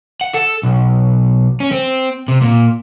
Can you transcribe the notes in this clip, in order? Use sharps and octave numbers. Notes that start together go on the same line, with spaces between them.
F#5
A4
B1
C#4
C4
C3
A#2